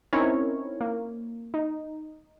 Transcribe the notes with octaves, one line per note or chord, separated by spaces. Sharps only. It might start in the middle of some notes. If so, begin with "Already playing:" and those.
C4 C#4 D#4 E4 A#4 C#5
A#3
D#4